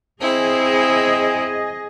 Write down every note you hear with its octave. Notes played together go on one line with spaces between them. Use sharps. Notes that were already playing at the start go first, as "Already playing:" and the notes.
C4 E4 G#4 D#5